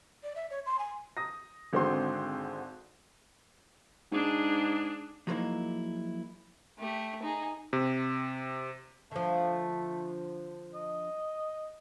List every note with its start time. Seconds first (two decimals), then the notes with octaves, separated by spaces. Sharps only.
0.23 D5
0.36 E5
0.50 C#5
0.66 C6
0.79 G#5
1.17 D#6 A#6
1.73 G#1 D3 G#3 C4 F#4 C6
4.12 G#2 D4 G#4
5.27 F3 F#3 G#3 A#3 D#4 E4
6.79 A3 G4
7.23 D#4 G#4
7.73 C3
9.11 D3 F3 A3
10.74 D#5